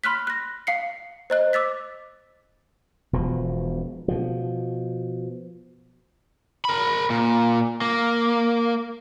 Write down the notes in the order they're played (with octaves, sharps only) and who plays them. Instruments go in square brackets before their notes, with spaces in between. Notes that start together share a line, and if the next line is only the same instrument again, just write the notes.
[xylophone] B5 C6 F6 F#6 B6
F#6 A#6
F5 C7 C#7
C5 D#5 F#6
D6 E6 A6 B6
[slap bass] E1 B2 F3
B2 F3
[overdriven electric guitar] A#4 B5
A#2
A#3